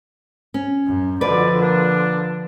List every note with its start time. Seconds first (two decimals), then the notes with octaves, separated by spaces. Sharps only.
0.54 C#4
0.86 F#2
1.21 F2 B2 D3 F3 B4 D5
1.62 A#3 D4